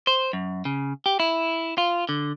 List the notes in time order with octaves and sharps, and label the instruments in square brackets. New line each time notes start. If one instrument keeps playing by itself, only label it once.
[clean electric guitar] C5
F#2
C#3
G4
E4
F4
D3